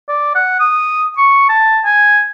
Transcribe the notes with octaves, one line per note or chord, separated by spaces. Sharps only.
D5
F#5
D#6
C#6
A5
G#5